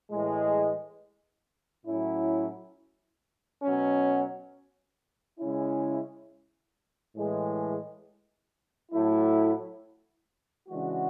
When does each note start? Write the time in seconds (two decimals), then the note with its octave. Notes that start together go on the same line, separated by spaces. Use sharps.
0.11 A2 E3 G#3
1.86 A2 F#3 C#4 E4
3.63 B2 F#3 C#4
5.40 C#3 G#3 C#4 E4
7.16 A2 E3 G#3
8.92 A2 F#3 A3 E4
10.68 C#3 E3 G#3 D4 F#4